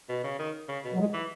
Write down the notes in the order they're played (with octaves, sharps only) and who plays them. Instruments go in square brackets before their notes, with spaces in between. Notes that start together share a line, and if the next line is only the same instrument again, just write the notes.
[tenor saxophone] B2
C#3
D#3
C#3
B2
[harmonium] F#3
G#3
[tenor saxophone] E3